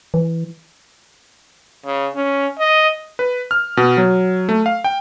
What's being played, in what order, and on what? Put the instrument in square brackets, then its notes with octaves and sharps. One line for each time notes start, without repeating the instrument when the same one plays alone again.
[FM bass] E3
[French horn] C#3
C#4
D#5
[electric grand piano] B4
F6
B2
F#3
A3
F5
G5